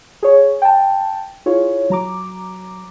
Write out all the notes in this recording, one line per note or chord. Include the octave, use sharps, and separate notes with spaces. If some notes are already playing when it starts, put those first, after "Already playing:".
G#4 C#5
G5 A5
E4 F4 G#4 C#5
F#3 A#5 D6